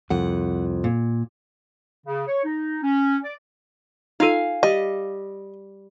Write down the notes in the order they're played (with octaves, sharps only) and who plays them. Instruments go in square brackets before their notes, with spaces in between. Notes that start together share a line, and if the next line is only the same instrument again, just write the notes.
[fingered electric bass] C2 F2 [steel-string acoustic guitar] F#5
[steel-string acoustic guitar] A#2
[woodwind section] C#3
C#5
D#4
C#4
D5
[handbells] D#4 F4 A4 [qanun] F5 G#5
[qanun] G3 [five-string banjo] D#5